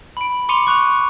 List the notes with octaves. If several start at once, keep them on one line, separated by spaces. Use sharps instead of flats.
B5 D7
B5 C6 D6 C#7 D#7 F7
C#6 F#6 C#7 F7